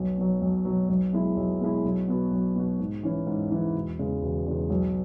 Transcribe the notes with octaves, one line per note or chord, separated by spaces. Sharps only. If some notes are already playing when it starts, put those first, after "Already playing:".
Already playing: B1
B2 F#3
B1
B2 F#3
B1
B2 G#3 E4
B1
B2 G#3 E4
B1
B2 B3 F#4
B1
B2 B3 F#4
G#2
E3 C#4 E4
G#2
E3 C#4 E4
E1
E2 C#3 G#3
E1
E2 C#3 G#3
B1